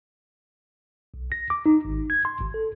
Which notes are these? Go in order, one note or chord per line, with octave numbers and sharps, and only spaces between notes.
B1
A#6
D6
D#4
G#1
G#6
C6
G#1
A4